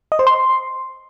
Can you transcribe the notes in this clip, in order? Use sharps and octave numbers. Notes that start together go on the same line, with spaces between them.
D#5
C5
C6